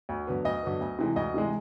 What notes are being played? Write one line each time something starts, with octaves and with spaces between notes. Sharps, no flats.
D2
D3 F#3 B3
D2 D#5
D3 F#3 B3
D2
C3 E3 G#3
D2 D#5
C3 E3 G#3